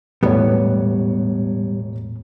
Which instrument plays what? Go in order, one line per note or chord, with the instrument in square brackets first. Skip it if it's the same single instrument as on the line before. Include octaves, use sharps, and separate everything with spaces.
[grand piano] E1 C#5 [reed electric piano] A2 [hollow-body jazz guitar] G3 B3